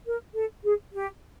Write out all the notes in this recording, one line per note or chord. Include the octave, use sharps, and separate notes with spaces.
A#4
A4
G#4
G4